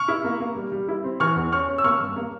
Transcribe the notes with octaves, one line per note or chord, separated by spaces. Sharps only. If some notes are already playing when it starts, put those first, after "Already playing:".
Already playing: C#6 F6
E4
A#3
A#3
G3
G3
E4
C4
E3 C#6 F6
E2
C#4 C#6 F6
C#4
E6
A#3 C#6 F6
G2
A#3